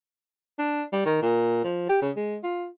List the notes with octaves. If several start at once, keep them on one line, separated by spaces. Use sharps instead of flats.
D4
G3
D#3
A#2
F3
G4
C#3
G#3
F4